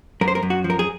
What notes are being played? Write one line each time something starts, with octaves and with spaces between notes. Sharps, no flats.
F#2 A#4
C5
A#4
F#2
F#4
F3
A#4
G#4